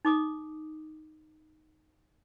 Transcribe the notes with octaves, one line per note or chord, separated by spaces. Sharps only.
D#4 D6 D#6